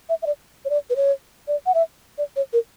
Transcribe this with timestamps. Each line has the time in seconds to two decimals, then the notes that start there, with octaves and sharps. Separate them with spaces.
0.09 E5
0.22 E5
0.26 D5
0.65 C#5
0.70 D5
0.90 B4
0.96 C#5
1.48 D5
1.66 F#5
1.74 E5
2.18 D5
2.36 C#5
2.53 A#4